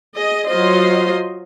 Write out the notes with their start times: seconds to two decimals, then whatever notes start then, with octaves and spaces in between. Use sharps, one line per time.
0.16 G#4 D#5
0.46 F#3 F4 C5 D#5 C6